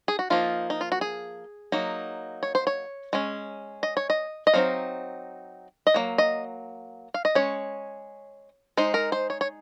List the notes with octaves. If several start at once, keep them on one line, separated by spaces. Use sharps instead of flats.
G#4
F#4
F3 A#3 D#4 F4
D#4
F4
F#4
G#4
F#3 A#3 D#4
C#5
C5
C#5
G#3 C#4
D#5
C#5
D#5
D#5
F#3 C4 D#4 F5
D#5
F#3 A#3
D#5
F5
D#5
G#3 C#4 C#5
G#3 D#4 C5
A#4
C5
C#5
C#5